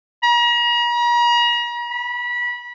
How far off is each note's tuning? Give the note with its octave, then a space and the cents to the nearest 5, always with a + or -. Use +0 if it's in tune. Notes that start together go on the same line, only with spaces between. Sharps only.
A#5 +40
B5 -25